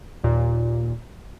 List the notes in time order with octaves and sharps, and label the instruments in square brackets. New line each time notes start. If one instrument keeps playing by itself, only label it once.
[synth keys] D#2 A#2